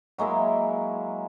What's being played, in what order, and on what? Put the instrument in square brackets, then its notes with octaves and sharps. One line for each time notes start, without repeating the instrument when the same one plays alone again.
[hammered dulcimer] F#3 G#3 A#3 E4